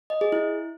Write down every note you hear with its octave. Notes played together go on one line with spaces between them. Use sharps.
D#5
G#4
E4